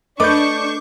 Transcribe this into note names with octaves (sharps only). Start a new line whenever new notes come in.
A3 D4 A4 B4 D#5 C#6 D6 G6